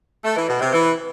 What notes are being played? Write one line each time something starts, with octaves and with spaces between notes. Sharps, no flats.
A3
E3
B2
C3
E3